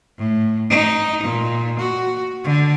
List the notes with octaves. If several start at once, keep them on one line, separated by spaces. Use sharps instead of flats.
A2
D#4
A#2
F#4
D3